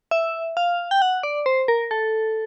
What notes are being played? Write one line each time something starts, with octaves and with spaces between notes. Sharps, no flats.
E5
F5
G5
F#5
D5
C5
A#4
A4